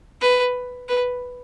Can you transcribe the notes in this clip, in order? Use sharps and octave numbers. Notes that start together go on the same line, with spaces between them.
B4
B4